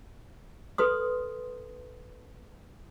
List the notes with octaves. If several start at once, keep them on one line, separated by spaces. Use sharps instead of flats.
A4 B4 C6 D#6